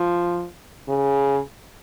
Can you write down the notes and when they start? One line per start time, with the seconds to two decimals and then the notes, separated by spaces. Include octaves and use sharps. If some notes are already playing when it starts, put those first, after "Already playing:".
Already playing: F3
0.88 C#3